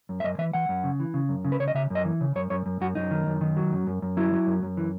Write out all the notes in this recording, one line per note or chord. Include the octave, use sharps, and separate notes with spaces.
F#2
E5
F#2 D#5
E3 E5
E3 F#5
F#2
C#3
E3
C#3
F#2
C#3
B4
C#3 C#5
D#5
C#3 E5
F#2 D#5
E3
C#3
F#2 C#5
F#2 C#5
F#2
F#2 F#4
F#2 D#4
D#3
F#2
D#3
F#3
F#2
F#2
F#2
F#3 E4
F#3
F#2
F#2
E3